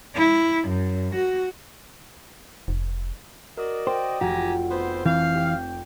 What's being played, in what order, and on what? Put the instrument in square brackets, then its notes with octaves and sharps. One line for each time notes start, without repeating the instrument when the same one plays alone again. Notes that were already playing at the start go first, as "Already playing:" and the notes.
[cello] E4
F#2
F#4
[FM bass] F1
[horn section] F#4 D5 D#5 [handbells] A#4
[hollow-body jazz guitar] C5 [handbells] G5
[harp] F1 [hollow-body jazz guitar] F#4 [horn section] G4 G#5 A#5
[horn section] B3 C4 C5
[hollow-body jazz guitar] E3 [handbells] C4 G6 [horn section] F5
[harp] G4